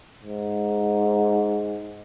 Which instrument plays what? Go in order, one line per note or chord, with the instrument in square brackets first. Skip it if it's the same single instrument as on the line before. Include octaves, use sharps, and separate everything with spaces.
[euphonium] G#2